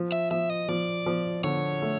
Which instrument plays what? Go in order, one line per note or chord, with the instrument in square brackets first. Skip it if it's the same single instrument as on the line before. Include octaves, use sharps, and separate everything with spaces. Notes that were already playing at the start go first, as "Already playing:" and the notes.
Already playing: [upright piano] F3
[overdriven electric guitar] E5
[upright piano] F3 [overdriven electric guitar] E5
[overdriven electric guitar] D#5
[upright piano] F3 [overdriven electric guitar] D5
[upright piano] F3
[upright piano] D3 [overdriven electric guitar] C#5
[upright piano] A3